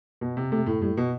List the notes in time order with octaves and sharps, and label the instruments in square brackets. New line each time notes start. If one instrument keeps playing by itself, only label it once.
[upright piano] B2
C3
[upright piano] C3 [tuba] A3
[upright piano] A2
[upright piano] A2 [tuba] G3
[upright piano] B2